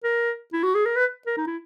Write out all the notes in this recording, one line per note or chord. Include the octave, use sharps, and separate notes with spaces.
A#4
E4
F#4
G#4
A#4
B4
A#4
D#4
E4